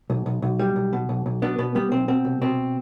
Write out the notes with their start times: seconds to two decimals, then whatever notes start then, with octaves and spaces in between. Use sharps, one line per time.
0.10 B1
0.26 B1
0.42 B1
0.59 G3
0.76 B1
0.93 B2
1.09 B1
1.26 B1
1.42 B2 B3 D4
1.58 B2 B3
1.75 G3 B3
1.92 B1 C4
2.08 B2 C4
2.25 C2
2.41 B2 C4